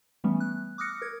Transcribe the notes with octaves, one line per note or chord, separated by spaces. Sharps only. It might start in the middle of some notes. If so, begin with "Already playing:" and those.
E3 G3 A3 B3 C#4
F#6
D6 D#6 F6 F#6 A#6 C#7
A#4 G#6